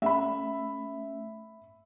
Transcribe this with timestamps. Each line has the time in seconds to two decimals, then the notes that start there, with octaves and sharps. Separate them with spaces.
0.02 A3 C#4 E5 B5